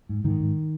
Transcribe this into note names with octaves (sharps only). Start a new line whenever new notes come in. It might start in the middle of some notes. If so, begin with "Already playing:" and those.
G#2
G#2 D#3
G#2